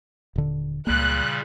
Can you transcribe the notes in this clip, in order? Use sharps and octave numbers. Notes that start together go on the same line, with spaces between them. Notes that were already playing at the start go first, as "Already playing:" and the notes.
D#1 D3
C#2 A#2 C#3 G3 A#3 F#6